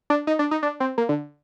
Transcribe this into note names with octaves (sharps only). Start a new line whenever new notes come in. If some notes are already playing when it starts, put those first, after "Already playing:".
D4
D#4
D4
D#4
D4
C4
A#3
D3